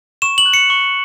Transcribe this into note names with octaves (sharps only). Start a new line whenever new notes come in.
C#6 E7
F#7
F#6
C#7
C#6